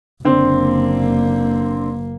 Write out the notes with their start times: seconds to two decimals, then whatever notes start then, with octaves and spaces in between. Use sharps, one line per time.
0.25 F#1 D3 A#3 C4